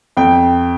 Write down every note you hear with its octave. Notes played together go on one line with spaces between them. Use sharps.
F2 G5